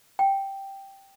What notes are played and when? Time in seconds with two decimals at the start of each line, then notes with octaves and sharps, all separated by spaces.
0.19 G5